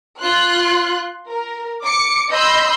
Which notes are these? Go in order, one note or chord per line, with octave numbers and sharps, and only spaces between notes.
F4 C6 F#6
A#4
D6 C#7
D#5 B5 C6 E6 G6